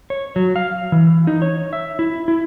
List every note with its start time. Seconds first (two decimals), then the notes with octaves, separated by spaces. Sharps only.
0.10 C#5
0.36 F#3
0.56 F5
0.92 E3
1.27 D#4
1.42 C#5
1.73 E5
1.99 E4
2.28 E4